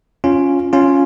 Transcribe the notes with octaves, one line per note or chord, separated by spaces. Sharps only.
C#4 F4
C#4 F4